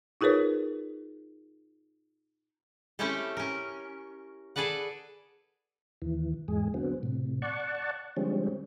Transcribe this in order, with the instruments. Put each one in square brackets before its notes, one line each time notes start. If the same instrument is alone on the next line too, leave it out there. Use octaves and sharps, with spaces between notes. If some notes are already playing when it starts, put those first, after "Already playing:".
[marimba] D#4 F4 G#4 A#4 B4 C#5
[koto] A3 C4 C#4 E4 G4 A4
C#4 A#4
G#4 A4 B4 D5 F#5
[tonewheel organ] D#2 E3
E2 G#2 G#3 G#4
D3 F#3 B3 C4
A2 C3
D5 F#5 A5 C#6
D3 F3 G3 G#3 C4 C#4